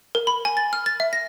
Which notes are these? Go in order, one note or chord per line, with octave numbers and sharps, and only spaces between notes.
A#4
B5
G#5
A6
F6
A6
E5
A#6